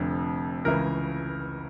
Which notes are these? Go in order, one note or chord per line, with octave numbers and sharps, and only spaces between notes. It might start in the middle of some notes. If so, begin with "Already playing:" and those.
Already playing: F1 F2 D3
C#2 C#3 E3 A#4